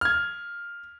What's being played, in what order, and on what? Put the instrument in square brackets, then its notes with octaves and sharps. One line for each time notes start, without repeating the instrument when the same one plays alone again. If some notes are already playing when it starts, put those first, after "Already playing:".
[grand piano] F6 G#6